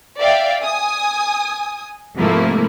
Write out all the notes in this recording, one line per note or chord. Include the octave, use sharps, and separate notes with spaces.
D5 E5 F5 G5
G#5 D#6
G#2 C3 F3 A3 A#3 E4